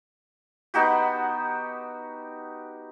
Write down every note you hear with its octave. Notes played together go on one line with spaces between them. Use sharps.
B3 D#4 F#4 G4